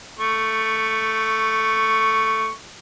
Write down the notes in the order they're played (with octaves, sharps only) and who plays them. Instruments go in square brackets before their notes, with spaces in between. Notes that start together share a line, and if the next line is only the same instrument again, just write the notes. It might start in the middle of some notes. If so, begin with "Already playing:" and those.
[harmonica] A3 C#6